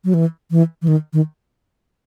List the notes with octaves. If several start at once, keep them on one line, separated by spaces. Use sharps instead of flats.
F#3
E3
E3
E3
D#3
D#3